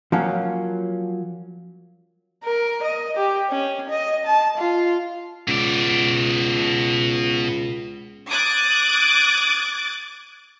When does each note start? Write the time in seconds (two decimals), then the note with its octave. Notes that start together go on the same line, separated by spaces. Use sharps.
0.12 F3 F#3 A#3 C#4
2.44 A#4
2.83 D#5
3.17 G4
3.50 C#4
3.90 D#5
4.26 A5
4.58 F4
5.48 C#2 B2 D5
8.31 D6 D#6 F#6 G#6 A6 D7